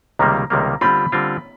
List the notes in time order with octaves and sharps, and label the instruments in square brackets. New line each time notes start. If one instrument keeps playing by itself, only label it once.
[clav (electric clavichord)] C#2 C3 D#3 G3 A#3 [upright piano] A#5
[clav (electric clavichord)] C#2 C3 D#3 G3 A#3
[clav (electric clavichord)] D3 G3 C4 F4 [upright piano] B5
[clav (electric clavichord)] D3 G3 C4 F4